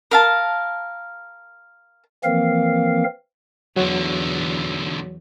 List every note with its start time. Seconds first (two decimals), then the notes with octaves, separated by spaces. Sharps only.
0.11 A#4 F5 A5
2.24 E3 F3 A#3 C4 A#4 F5
3.76 B1 E2 D3 F#3 F#4 C#5